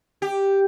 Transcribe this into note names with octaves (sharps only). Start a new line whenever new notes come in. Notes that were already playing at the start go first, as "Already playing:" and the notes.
G4